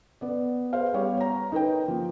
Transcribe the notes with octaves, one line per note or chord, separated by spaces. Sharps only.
B3 D5
G#4 B4 C5 F5
G3 B3 G4 C#5 F5
C#5 A#5
D#4 A#4 B4 G5
F3 A#3